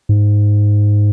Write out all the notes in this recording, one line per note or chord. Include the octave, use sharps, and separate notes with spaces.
G#2